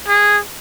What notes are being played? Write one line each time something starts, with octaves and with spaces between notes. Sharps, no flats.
G#4